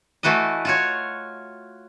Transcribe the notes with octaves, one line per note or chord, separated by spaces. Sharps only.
E3 A3 F#4 B4 D#5
F4 F#4 C#5